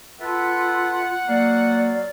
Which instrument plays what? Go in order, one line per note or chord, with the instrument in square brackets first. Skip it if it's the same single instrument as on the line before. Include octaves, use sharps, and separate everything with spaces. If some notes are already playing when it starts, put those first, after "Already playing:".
[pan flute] F4 [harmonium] A4 B4 E5 [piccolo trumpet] F#5
[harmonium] F#3 F5 [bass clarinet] A#3 [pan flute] D5